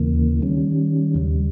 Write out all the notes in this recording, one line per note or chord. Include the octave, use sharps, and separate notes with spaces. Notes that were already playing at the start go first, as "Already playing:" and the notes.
Already playing: D#2 C#3 E3 A#3
D#3 G3 C#4
D#2 C#3 G3